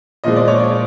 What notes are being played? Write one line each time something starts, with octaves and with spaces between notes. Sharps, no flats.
A#2 F3 G#3 D#5
D5
C#5
D5